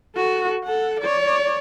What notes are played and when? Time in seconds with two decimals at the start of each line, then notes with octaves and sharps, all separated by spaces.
0.16 F#4 A4
0.64 A4 F#5
1.00 C#5 D5